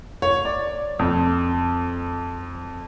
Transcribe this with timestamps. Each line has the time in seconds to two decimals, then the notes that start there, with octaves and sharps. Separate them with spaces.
0.22 C#5
0.45 D5
0.99 F2